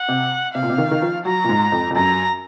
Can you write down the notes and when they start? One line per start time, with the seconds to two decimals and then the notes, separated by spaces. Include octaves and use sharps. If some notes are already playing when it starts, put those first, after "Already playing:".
Already playing: F#5
0.08 C3
0.55 C3 F5
0.63 A#2
0.70 C3
0.78 D#3
0.91 D#3
1.02 F3
1.25 F#3 A#5
1.44 A#2
1.49 G#2
1.72 F2
1.91 F2
1.95 F#2 A#5